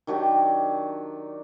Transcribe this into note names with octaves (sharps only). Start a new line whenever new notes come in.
D#3 F#3 D4 G4